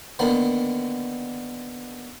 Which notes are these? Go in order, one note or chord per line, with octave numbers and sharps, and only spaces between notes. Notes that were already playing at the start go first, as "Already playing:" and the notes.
D3 D#3 A#3 B3